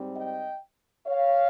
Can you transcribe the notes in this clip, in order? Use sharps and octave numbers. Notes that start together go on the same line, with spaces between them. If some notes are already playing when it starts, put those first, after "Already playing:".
Already playing: G#2 G3 C4
D#5 G5
C#5 F5